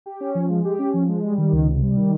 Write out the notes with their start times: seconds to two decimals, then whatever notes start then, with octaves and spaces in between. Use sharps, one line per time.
0.06 G4
0.21 C#4
0.35 F3
0.50 G#3
0.65 G4
0.79 C#4
0.94 F3
1.08 G#3
1.23 G3
1.38 D#3
1.52 C#2
1.67 C3
1.82 G3
1.96 D#3